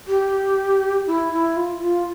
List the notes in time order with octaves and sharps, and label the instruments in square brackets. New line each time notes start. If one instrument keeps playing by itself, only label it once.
[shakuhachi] G4
E4
E4
F4
F4